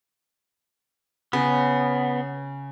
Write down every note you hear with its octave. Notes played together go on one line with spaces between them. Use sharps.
C#3 B3